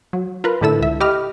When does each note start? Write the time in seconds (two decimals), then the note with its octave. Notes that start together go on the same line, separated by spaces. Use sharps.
0.13 F#3
0.44 F4 A#4 B4
0.61 A2 D3 E4 A4 E6
0.80 C#2 E5
1.00 G4 D#5 B5 D6 F6